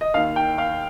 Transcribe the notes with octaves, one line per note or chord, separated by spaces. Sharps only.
D#5
D#2 D#3 F5
G5
F5